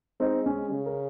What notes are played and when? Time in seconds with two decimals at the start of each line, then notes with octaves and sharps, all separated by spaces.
0.20 G#3 C4 D#4
0.46 C#4
0.72 C#3
0.86 A#4